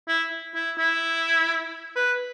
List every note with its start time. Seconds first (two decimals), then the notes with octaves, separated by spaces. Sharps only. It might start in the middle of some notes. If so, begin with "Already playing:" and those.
0.08 E4
0.55 E4
0.78 E4
1.96 B4